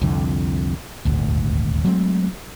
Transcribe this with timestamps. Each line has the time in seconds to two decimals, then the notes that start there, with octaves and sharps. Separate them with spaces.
0.01 C2 F2 D3
1.05 D#1 G#1 D2
1.85 F#3 G#3 A3 C4